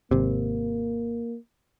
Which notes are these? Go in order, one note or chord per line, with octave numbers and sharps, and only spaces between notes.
G#1 C3 A#3